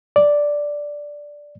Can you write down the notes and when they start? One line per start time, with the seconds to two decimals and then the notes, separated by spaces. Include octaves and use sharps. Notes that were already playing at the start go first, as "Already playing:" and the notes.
0.16 D5